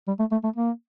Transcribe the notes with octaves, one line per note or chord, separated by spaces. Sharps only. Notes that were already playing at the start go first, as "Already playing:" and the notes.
G3
A3
A3
A3
A#3